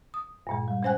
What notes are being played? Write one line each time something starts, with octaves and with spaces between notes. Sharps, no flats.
D#6
G2 A#2 G#3
G3
G#3 C#4 C5 G5 G#5 F#6